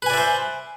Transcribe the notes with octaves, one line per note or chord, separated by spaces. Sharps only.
B4 C5 D5 E5 G#5